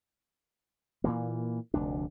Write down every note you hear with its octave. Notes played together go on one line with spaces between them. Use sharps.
A#2 E3 A#3
F1 D2 D4